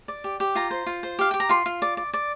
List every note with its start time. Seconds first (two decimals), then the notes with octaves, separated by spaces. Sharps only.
0.08 D5
0.24 G4
0.40 G4
0.55 F4 A#5
0.71 C5
0.86 F4
1.03 C5
1.19 G4 F5
1.31 G4 G5
1.40 A#5
1.49 F4 C6
1.66 F4
1.82 D5
1.97 D5
2.14 D5